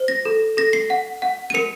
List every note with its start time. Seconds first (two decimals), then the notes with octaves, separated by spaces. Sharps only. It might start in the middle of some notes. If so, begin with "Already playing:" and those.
Already playing: C5
0.08 A#6
0.25 A4
0.57 A4 A#6
0.73 C7
0.90 F#5
1.22 F#5
1.50 D#7
1.54 A#4 C#7